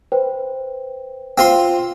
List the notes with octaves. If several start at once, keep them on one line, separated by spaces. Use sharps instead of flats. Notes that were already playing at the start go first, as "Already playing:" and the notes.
B4 C5 G5
C4 F4 C6